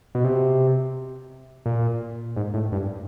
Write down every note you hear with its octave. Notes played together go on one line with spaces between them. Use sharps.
B2
C3
A#2
G#2
A2
G2